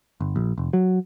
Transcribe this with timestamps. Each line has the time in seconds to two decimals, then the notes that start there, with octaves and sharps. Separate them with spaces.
0.21 G1
0.36 A#1
0.58 F1
0.73 F#3